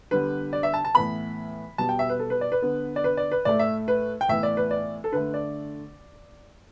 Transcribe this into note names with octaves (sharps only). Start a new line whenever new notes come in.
D3 G3 B3 B4
D5
E5
A5
A5
A2 E3 B3 B5
B2 G3 B3 A5
G5
E5
B4
A4
B4
D5
B4
D3 B3
D5
B4
D5
B4
A2 A3 D5
E5
B4
G5
A2 E3 B3 E5
D5
B4
D5
A4
D3 A3 B4
D5